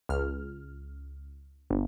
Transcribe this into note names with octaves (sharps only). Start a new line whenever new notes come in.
C#2 F6
G1